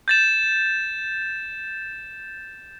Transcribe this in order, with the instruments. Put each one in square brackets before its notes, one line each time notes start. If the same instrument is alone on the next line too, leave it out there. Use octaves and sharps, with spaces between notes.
[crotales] G6 A6 E7